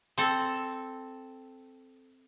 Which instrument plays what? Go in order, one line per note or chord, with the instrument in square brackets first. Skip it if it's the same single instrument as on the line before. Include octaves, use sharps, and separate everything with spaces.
[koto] C4 A4